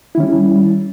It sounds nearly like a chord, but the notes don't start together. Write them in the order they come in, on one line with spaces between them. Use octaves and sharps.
E4 D#3 C#4 G3